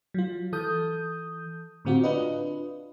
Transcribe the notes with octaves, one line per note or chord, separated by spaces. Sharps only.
F#3 F4
E3 A4 D#6 G6
A2 D3 C4 F4 F#4
D4 F4 B4 D#5